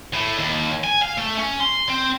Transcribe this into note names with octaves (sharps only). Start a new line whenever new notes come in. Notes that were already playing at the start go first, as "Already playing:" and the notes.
A2
D#2
G#5
F5
A3
C#4
C6
C4